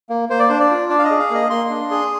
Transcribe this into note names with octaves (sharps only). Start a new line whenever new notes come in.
A#3
A#3 C5
D5
D4 C5
D5
F4
D4 D5
F5
D#5
G#4
F5
A#3 D#5
A#3 C6
D4
G#4